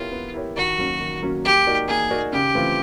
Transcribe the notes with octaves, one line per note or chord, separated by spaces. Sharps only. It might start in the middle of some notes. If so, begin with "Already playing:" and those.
Already playing: B3 E4 F4 G4 A#4 C#5
B3
E4 G4 A#4 C#5
D#3 F#4
F#3 A#3 C#4
D#3
F#3 A#3 C#4
A#3 G4
D#4 F#4 A#4 D5
A#3 G#4
D#4 F#4 A#4 D5
C#3 G4
E3 A3 C4 F4